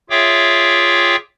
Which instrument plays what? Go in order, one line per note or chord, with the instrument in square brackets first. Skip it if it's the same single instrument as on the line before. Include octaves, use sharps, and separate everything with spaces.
[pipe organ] F4 G#4 C#5 E5 G5 D6